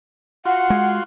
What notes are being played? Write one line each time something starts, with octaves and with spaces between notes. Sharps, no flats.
F4 F#4 F#5 C6
G#3